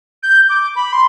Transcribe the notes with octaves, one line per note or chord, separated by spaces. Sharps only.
G6
D6
B5
C6